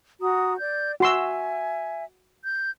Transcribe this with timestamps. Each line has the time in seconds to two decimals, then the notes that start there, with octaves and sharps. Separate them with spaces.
0.21 F#4 A#5 D#6
0.57 D5 G6
1.00 F#4 E5 G#5 C6 E6
2.44 G6